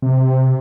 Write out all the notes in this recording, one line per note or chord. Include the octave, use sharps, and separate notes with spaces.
C3